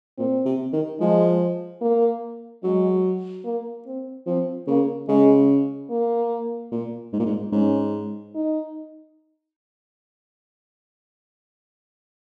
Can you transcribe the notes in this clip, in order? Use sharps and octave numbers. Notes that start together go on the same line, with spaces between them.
A#2 C4
C3
D#3
F3 G#3
A#3
F#3 G#3
A#3
C4
F3 C4
C#3 A#3
C#3 G#3
A#3
A#2
G#2
A#2
G#2
G#2 C#4
D#4